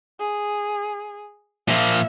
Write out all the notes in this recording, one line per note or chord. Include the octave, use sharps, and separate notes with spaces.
G#4
A#2 F3 E5